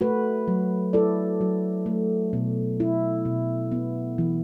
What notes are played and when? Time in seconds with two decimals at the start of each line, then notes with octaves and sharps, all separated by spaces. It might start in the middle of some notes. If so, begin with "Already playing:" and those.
0.01 A3 F#4 B4
0.48 F#3
0.93 E4 A4 D5
1.41 F#3
1.86 A3
2.33 B2
2.80 E4
3.25 B2
3.72 B3
4.18 E3